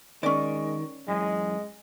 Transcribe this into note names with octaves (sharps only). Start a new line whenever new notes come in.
D#3 G#3 C#4 D5
F#2 E3 G#3